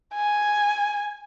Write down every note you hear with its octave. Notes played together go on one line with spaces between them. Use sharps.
G#5